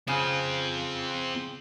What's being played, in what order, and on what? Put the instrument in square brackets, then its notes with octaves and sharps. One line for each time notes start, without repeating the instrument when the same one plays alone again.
[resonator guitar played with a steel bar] C#3 [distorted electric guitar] C4 F4